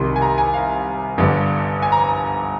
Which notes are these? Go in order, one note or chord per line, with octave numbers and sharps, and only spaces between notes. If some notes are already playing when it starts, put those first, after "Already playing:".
Already playing: C2 C3 D#3 C6
G#5
A#5
G#5
F5
G1 G2 D3
G#5
A#5